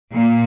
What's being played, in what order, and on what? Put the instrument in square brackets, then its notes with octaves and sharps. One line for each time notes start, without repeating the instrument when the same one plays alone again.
[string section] A#2